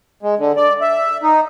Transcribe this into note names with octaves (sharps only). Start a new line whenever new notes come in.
G#3
D3
D5
E5
D#4